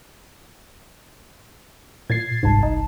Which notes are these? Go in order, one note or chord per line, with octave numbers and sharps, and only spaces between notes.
A#2 G#6 A6 C7
G1 C2 G#2 A5
D#4